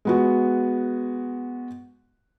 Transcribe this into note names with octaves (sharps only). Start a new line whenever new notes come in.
G#3 B3 F#4